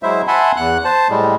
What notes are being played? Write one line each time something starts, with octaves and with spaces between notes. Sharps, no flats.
F#3 G#3 E4 C5 E5
E5 F#5 G#5 A5 B5 C6
E2 F#5 F#6
C5 A5
A2 G3 G#3